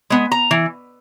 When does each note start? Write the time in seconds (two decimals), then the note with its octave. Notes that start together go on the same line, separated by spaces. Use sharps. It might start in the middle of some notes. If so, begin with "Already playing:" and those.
0.10 G#3 B3
0.32 A#5
0.51 E3